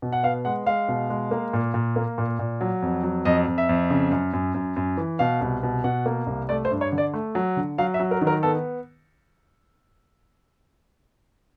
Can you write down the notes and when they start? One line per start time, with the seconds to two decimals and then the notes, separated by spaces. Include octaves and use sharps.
0.02 B2
0.12 F#5
0.23 B3 F5
0.45 G#3 F#5
0.66 G#3 F5
0.88 B2
1.10 G#3
1.31 A#3
1.53 A#2
1.74 A#2
1.96 A#3
2.18 A#2
2.39 A#2
2.61 F#3
2.82 F2
3.03 F#3
3.25 F2 D#5
3.47 F2
3.58 E5
3.69 F2
3.90 C#3
4.11 F#2
4.33 F#2
4.54 F#2
4.76 F#2
4.97 E3
5.19 B2 F5
5.41 C2
5.63 B2
5.84 B2 F#5
6.06 A#3
6.27 C2
6.49 A3 D5
6.65 C5
6.71 G2
6.81 C#5
6.92 D3
6.98 D5
7.14 A3
7.35 F#3
7.57 D3
7.78 F#3 F5
7.94 E5
8.00 F#3
8.11 A#4
8.21 D#3
8.27 A#4
8.43 B3 A4